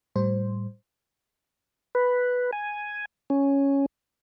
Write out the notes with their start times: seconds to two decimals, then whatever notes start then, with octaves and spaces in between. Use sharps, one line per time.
0.16 A2 G3 C5
1.95 B4
2.53 G#5
3.30 C#4